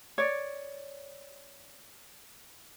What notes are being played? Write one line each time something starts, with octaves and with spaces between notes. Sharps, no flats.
C#5 D5